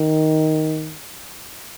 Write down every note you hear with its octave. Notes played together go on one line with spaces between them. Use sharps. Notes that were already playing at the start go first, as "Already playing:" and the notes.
Already playing: D#3